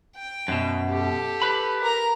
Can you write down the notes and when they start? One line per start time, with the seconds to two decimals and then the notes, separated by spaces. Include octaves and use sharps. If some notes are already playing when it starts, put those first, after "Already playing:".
0.15 G5
0.48 F#2 B2
0.89 G4 A4
1.42 B4 B5
1.80 A#4 A#5